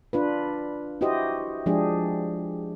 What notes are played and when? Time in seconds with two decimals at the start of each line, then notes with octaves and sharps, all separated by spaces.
0.13 D4 F4 B4
1.01 E4 F#4 G4 C5 D#5
1.66 F3 G#3 D4 G4 G#4